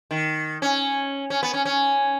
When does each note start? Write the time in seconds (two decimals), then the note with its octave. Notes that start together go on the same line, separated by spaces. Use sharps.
0.11 D#3
0.62 C#4
1.30 C#4
1.43 B3
1.54 C#4
1.65 C#4